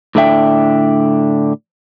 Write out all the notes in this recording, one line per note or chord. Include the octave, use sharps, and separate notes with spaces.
A2 D3 D4 E5 G5